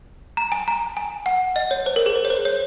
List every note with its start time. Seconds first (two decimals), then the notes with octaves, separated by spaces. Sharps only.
0.37 A#5
0.52 G#5
0.68 A#5
0.97 G#5
1.26 F#5
1.56 D#5
1.71 C#5
1.86 C5
1.96 A#4
2.06 G#4
2.16 C5
2.25 C#5
2.30 C5
2.45 C#5